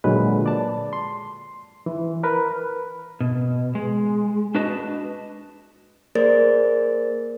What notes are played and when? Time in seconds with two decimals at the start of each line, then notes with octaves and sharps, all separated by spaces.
0.04 A#2 D3 F#3 G#3 B4
0.46 D5 A5
0.93 C6
1.86 E3
2.23 A#4 B4
3.20 B2
3.75 G#3
4.55 D4 F#4 B4 D#5 A5
6.15 A#3 G#4 A#4 C5 D5 A6